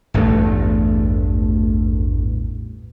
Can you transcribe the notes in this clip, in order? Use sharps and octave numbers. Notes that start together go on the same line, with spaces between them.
A1 E2 G2 A3